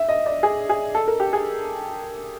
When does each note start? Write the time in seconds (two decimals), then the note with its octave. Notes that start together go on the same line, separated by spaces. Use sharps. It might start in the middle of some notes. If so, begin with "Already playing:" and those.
Already playing: E5
0.09 D#5
0.26 D5
0.43 G#4
0.69 G#4
0.95 A4
1.08 A#4
1.20 G4
1.33 G#4